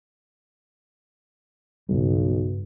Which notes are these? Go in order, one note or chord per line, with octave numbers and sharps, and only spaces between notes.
B1 G2 C#3 G3